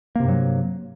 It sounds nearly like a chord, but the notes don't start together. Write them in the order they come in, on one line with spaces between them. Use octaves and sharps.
A#3 C3 G2 F#3